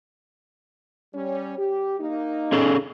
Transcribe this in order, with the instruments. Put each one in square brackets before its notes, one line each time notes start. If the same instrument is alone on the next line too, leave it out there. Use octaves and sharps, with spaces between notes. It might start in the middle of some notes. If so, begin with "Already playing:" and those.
[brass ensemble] G3 C#4
G4
A#3 D#4
[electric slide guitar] C#4 G#4 A4